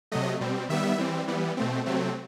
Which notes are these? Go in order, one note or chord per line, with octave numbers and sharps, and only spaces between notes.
C3 F#3 A3 D#5
B2 G3 C4
D#3 G3 B3 E5
E3 G3 C4
E3 G3 B3
B2 A3 C4
C3 F#3 A3 C4